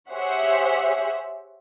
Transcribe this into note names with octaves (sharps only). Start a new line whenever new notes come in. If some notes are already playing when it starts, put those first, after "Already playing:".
G4 G#4 C5 C#5 E5 F#5